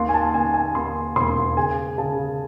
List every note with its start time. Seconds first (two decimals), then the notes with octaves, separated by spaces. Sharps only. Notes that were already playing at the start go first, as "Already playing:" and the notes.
Already playing: D#2 C6
0.09 G#5
0.14 A5
0.34 D#2 G#5
0.54 G#5
0.75 D#2 C6
1.16 E1 C6
1.57 C#3 G#5
1.98 C#3 A5